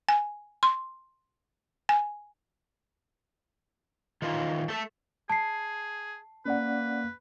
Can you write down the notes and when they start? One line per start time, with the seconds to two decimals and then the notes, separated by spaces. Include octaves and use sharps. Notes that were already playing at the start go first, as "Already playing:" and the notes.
0.09 G#5
0.63 C6
1.89 G#5
4.22 D#3 E3 F4
4.68 A3 A4
5.29 G#4 A5 C7
6.45 A#3 C#4 B4 D5 F#5